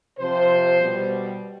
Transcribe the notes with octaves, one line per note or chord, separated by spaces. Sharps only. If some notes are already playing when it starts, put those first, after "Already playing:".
C3 F3 C5
B2 G3